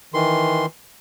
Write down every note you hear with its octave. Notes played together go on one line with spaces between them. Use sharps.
D#3 E3 C6